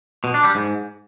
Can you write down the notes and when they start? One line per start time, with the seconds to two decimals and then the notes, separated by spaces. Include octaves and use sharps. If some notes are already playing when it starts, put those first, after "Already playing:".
0.24 B2
0.34 D4
0.45 G3
0.55 G#2